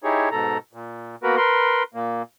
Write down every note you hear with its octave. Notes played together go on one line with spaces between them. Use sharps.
D#4 E4 G4 G#4 C#5
G#2 B2 A4 A#5
A#2
A#3 B3 F#4 A#4 B4
A#4 B4 C6
A#2 A#3